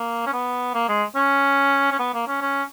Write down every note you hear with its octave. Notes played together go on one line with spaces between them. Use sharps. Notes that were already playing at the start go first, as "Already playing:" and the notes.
Already playing: A#3
C#4
B3
A#3
G#3
C#4
C#4
B3
A#3
C#4
C#4